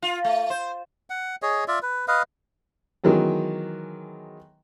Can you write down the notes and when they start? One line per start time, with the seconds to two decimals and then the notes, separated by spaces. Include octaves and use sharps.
0.02 F4
0.24 A3
0.50 C5
1.10 F#5
1.42 G#4 C#5 D#5
1.68 F4 D5 E5
1.82 B4
2.08 B4 D#5 F5
3.04 D#3 E3 F#3 G#3 B3